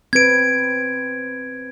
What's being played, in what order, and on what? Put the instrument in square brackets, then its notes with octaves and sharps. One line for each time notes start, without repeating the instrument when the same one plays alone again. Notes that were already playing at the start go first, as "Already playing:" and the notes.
[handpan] C4 B4 [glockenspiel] G#6 D7